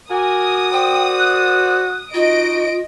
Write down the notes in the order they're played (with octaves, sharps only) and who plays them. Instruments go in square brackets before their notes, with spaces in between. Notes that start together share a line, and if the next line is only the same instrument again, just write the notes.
[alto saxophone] F#4 [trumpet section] A#4 G#5 D6 [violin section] D#6
[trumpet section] A#4 C5 D5 [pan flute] G5
[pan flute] F#6
[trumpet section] D#4 F#4 [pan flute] F4 [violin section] D#5 D7